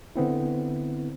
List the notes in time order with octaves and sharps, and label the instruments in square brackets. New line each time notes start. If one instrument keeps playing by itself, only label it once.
[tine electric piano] D3 B3 C4 E4